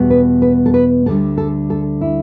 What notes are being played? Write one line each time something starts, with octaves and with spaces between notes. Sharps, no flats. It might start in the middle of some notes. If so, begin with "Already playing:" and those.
Already playing: E2 B2 G3 B3
B4
B4
A4
B4
D2 D3 G3 A4
A4
A4
E4